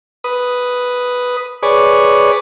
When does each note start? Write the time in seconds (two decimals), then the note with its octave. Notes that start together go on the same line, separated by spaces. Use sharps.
0.24 B4 D#6
1.63 G#4 B4 C#5 D5